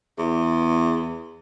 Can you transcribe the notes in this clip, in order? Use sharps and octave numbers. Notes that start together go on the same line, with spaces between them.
E2